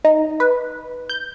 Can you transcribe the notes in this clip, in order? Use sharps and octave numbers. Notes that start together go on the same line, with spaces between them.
D#4
B4
G6